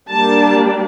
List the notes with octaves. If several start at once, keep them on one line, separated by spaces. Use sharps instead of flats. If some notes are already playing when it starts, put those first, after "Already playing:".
G3 A#3 D4 A5